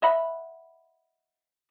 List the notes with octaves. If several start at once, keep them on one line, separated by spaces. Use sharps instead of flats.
D#5 E5 F#5 B5